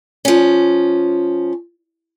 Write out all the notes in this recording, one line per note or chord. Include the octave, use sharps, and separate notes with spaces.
F3 C#4